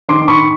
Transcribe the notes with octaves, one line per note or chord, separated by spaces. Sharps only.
D#3 C6 D6
D6
D#3 B5 C#6